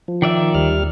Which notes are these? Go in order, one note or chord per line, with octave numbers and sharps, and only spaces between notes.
F3
D#3 D5 E5
D#2 G3 F6